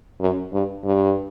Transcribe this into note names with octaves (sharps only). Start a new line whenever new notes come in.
F#2
G2
G2